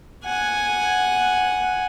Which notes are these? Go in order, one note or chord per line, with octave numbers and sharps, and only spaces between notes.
F#5 G#5